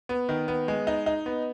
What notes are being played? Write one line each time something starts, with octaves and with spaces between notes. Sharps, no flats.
B3
D#3
B3
G#3
D#4
D#4
B3